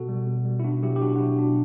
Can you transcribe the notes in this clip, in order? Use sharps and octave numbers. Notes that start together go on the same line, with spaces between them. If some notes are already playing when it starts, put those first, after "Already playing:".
Already playing: B2 F#4 A4
G3
B2
G3
E4
B2 D4 F#4
F#3 E4 G4
G4
B2 D4 F#4
F#4
F#3 E4
B2 D4